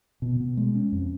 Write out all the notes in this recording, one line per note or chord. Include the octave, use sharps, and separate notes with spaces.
B2
B2
G#3
C#4
F2